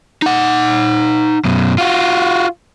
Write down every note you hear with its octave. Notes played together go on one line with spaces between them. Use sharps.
D#4 F#5
F#2 B2
F4 F#4